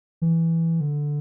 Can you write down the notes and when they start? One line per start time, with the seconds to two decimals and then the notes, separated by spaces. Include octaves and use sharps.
0.22 E3
0.81 D3